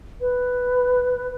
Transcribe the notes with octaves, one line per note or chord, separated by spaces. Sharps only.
B4